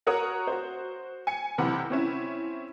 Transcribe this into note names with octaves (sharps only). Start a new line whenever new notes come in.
F#4 A#4 C#5 F#5 A#5 D#6
F#4 C5
G#5 C#7
B1 C3 E3 C4 F#5 B5
C4 C#4 E4